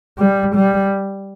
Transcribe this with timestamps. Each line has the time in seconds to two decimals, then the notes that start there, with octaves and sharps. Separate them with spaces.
0.19 G3
0.55 G3